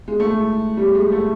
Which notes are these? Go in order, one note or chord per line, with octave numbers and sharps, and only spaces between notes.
G#3
A3
G#3
G3
G#3
A3